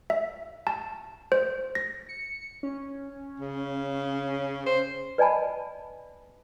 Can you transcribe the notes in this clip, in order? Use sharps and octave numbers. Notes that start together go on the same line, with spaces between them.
E5
A5
C5
A#6
C#7
C#4
C#3
C5
B4 D5 D#5 G#5 A5 B5